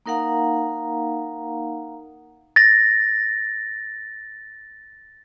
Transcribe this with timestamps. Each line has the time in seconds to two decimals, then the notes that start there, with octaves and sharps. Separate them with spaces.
0.06 A#3 D#4 A#4 F5 F#5 A#5
2.56 A6 A#6